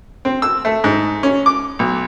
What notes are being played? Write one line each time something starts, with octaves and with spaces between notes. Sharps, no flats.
C4
E6
A3
G#2
C#4
D6
B1